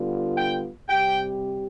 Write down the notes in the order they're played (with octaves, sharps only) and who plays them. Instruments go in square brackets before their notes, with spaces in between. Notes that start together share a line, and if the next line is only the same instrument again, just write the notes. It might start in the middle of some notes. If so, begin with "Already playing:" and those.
Already playing: [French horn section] D3 G3 B3 F4
[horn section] G5
[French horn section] C3 G3 C4 G4 [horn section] G5